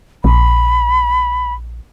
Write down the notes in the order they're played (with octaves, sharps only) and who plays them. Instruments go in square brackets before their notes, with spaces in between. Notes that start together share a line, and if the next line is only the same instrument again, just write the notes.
[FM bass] A#1 [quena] B5